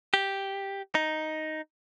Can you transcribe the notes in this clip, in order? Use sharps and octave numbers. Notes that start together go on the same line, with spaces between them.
G4
D#4